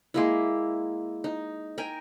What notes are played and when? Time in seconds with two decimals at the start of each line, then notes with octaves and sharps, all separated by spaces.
0.14 G#3 A#3 E4
1.24 D#4
1.78 A#4 G5 G#5